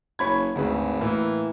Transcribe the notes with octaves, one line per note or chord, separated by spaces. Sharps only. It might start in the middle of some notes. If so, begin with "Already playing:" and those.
F#1 C#5 B5 G#6
G#1 D2 G#4 B4
A2 E3 A#3